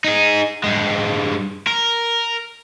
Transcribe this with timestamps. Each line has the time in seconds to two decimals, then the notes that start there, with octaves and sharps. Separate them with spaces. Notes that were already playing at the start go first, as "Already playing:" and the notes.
0.04 D#4 G#4
0.64 G2 G#3
1.67 A#4